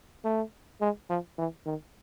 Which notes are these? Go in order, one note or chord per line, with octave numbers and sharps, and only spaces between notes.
A3
G#3
F3
E3
D#3